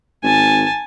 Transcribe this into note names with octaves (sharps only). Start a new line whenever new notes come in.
G#1 G#5 A5